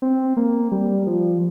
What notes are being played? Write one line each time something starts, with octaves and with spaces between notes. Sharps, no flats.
C4
A#3
G3
F3